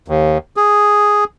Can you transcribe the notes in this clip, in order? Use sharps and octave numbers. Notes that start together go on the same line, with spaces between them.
D#2
G#4